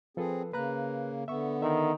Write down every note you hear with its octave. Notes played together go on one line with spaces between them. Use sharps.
F3 C4 G#4 A4 B4
C#3 A#3 B4 A#5 F#6
D3 B3 E5 C#6
D#3 E5